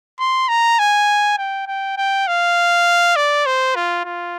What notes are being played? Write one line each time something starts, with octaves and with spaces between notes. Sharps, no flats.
C6
A#5
G#5
G5
G5
G5
F5
D5
C5
F4
F4